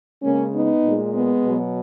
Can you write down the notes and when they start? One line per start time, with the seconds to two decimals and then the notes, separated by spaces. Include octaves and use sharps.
0.22 C#3 G#3 A#3 C#4
0.52 B3 D#4
0.83 A#2 G#3
1.13 G#3 B3
1.44 B2 F#3